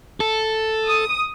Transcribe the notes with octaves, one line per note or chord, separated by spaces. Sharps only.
A4
D#6